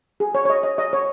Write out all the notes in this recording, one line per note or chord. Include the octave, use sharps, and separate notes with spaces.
G#4
C#5
C#5
D#5
D#5
D#5
C#5